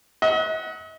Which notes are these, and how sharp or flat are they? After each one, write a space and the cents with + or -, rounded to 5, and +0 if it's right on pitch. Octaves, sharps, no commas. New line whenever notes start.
D#5 +45 F#5 +0